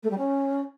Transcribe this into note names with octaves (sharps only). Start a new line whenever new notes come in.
A3
G3
C#4